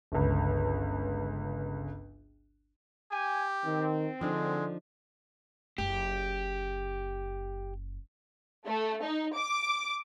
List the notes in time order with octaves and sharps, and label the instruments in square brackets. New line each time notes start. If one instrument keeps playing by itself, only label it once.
[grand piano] G1 C#2
[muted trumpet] G4 [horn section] G#5
[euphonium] D#3 [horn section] C4
[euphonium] D3 [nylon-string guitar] F3 D4 D#4 [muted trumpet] G#3
[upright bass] F#1 [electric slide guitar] G4
[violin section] A3
D#4
D6